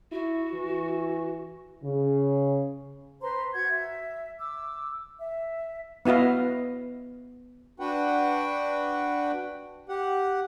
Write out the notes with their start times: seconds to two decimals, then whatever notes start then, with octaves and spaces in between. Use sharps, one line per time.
0.12 E4 F#4
0.54 E3
1.84 C#3
3.21 B4 C5 A#5 C6
3.54 F#4 F#5 G6 G#6
3.69 E5
4.39 D6 E6
5.20 E5
6.05 B3 E4 F#4 D#5 F5
7.80 D4 F#4 B4 F#5 G5
9.89 G4 F#5